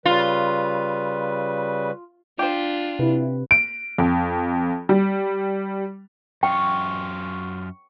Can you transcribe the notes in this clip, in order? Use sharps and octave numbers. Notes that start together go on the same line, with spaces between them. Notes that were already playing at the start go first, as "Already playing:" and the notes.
C#3 G3 F4 B4
D4 F4 G4 C5
C3 E4 B4
D7
F2
G3
F#2 F4 G5 C#6